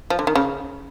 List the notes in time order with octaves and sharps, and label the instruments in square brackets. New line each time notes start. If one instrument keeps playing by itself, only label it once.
[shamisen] F3
D3
D#3
C#3